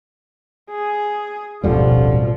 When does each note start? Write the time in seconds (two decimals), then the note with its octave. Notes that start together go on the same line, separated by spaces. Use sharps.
0.70 G#4
1.64 D1 A1 F2 B2 D3 F3 G3